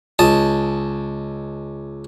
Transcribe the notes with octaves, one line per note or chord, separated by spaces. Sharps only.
C#2 A5 D#6